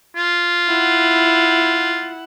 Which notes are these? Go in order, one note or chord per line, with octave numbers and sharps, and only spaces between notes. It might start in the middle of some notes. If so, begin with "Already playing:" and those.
F4
E4 F#5